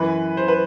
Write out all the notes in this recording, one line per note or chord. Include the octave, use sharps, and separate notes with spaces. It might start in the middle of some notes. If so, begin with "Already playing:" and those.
Already playing: F#2 E3 B4
C5
B4